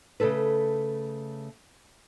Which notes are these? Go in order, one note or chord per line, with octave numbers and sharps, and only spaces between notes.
C#3 A3 A4 B4